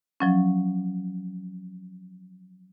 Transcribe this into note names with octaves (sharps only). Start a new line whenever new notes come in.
F3 F#3 C#4